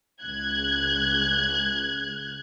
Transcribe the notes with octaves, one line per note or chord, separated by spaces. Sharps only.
C#2 F#6 G#6